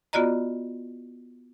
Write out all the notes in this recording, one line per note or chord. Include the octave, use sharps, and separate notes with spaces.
B3 F4 F#4 D5 D#5 A#5